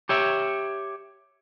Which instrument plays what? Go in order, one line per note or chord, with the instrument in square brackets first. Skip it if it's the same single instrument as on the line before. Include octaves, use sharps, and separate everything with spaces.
[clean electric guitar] G4 C#5 E5